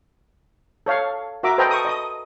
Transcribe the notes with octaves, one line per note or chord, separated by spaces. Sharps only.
A4 C#5 F5
F#4 A#4 E5 A#5 D6
A4 B4 C5 D#5 G5 A#5
C#6 D#6
D#5 D#6